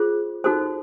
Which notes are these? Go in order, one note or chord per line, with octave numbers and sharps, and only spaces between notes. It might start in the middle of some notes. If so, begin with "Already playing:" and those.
Already playing: F4 G#4 C5
D#4 F#4 A4 C5